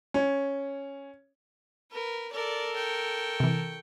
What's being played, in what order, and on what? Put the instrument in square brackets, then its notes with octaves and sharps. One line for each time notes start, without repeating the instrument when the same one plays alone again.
[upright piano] C#4
[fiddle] A#4 [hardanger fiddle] B4
[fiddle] A4 A#4 [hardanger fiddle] D5
[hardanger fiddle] G5 C#6
[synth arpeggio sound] C3 E3